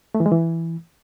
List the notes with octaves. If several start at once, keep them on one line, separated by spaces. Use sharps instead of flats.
A3
E3
G#3
E3